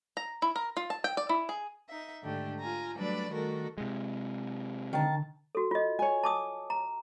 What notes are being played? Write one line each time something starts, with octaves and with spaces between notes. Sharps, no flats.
A#5
E4
A#4
F4
A5
G5
D5
E4
G#4
D#4 E5
G#2 D3 A3 D4 G4
F4 G#5 A#5
F#3 G3 A3 D4 B4 D5
D#3 G3 A3 F#4 A4 A#4
C3 G#3
D3 D#3 A5
F#4 A4
F4 D#5
C#5 G#5
A5 D6 D#6
A#5